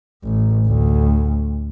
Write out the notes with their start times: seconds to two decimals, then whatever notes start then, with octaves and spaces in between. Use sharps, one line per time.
0.24 A1
0.66 D2